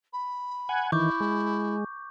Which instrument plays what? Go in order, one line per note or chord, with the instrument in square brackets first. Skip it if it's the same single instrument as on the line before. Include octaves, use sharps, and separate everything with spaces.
[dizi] B5
[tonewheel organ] F#5 G#5
[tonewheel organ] D#3 E3 [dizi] E4 [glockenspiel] C#6 D6 G6
[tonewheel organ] G#3